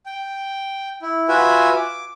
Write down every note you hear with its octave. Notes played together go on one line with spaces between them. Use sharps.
G5
E4
F4 F#4 B4 E5 F#5 G#5
D6